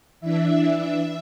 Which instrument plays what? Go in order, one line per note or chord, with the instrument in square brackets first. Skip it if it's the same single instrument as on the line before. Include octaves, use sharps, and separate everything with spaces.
[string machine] E3 D4 E5